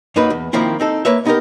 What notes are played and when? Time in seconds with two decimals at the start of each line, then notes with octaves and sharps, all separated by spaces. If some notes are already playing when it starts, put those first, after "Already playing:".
0.16 F#2 A#3 D#4 F#4 B4
0.30 E2
0.53 D#3 F3 A#3 C4 E4
0.80 C4 D#4 A4
1.05 A#3 B4 C#5 E5
1.25 B3 D#4 F4 G4 A#4